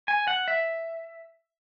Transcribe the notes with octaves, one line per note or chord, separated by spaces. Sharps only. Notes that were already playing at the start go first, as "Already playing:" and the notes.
G#5
F#5
E5